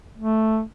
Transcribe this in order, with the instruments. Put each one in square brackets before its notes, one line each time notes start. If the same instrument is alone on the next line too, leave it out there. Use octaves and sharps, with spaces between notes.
[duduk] A3